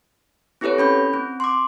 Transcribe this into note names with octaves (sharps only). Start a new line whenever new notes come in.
C4 E4 G4 A4 B4 C#5
C#4 B5 G6
C4
C6 D6